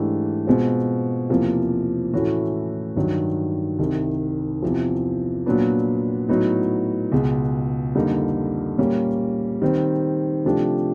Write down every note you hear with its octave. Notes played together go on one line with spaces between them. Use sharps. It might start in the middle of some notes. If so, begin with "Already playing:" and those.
Already playing: G#2 E3 A3 D4 G4
B2 G#3 C4 F4
E2 C3 F3 A#3
A2 E3 A3 C#4 F#4
G2 D#3 F#3
C2 C3 D#3
E2 C3 F3
A#2 F#3 B3 D4
A2 F#3 B3 D#4
C#2 B2 G#3
F2 D3 G3 A#3 D#4
A#2 G3 A#3 C#4
D#3 G3 C4
C3 F3 A3 D4 G4